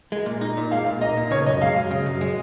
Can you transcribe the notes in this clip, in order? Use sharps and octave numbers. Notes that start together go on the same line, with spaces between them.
G#3
A#2
D#4
A#2
G#3 F5
A#2
D#4 D#5
A#2
C#3 C#5
F#2 D#5
G#3 F5
F#2
C#3
F#2
G#3